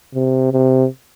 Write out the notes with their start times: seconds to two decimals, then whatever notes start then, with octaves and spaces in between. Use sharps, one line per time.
0.15 C3
0.52 C3